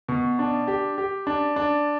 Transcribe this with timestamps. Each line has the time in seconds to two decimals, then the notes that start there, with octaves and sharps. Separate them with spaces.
0.08 B2
0.39 D4
0.68 G4
0.98 G4
1.27 D4
1.56 D4